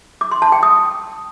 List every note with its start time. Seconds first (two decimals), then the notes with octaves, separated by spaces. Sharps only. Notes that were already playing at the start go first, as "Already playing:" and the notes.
0.21 D6
0.31 C6
0.42 A5
0.52 G5
0.63 D#6